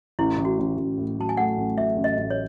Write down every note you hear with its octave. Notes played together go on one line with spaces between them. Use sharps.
A1 E4
A1
F#4
A1
A1
A2
F#3 A5
G#5
A3 F#5
A1
F#3 E5
A1
D#5
A1
C#5